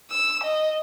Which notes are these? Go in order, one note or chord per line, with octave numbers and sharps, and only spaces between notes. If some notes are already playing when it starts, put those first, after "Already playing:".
E6
D#5